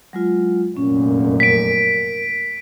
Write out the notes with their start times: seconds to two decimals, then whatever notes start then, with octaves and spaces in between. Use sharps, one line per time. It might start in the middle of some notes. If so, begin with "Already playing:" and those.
0.13 F#3 G#3 F4
0.77 F1 F#2 A#2 C#4
1.40 A#4 B6 D7